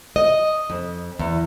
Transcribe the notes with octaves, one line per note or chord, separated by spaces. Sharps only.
D#5
F2
E2